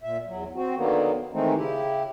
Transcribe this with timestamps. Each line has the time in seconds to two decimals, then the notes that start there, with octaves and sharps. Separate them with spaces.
0.01 A#2 E5
0.27 E2 F#3
0.55 C4 F#4
0.76 D3 D#3 F#3 A#3 B3
1.33 D#3 E3 G#3 A3 C4 D#4
1.55 C#3 E4 G4